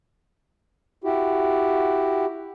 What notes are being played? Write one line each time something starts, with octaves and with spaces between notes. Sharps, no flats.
E4 F#4 G4